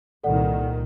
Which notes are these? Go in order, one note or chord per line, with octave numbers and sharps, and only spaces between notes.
C2 A#2 D#3 A4 D5 F#5